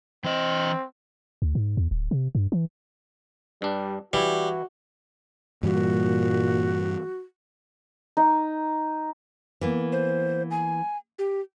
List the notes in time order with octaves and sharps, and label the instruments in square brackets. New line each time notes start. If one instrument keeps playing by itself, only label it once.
[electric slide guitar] E3 D#5 [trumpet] C4
[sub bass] D2
G#2
E2
D1
C3
G2
E3
[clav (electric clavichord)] G2 D4 [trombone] G3
[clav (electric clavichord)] E3 E4 [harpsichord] G3 [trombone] F#4
[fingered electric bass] G2 E3 G3 [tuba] A#2 [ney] F#4
[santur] D#4
[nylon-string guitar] E3 A#3 B3
[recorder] C5
G#5
G4